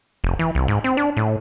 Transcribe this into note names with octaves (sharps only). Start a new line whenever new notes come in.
F1
E3
C2
G#2
C4
D4
A2